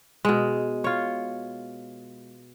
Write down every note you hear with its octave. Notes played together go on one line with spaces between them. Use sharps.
B2 G#3
F4 C#5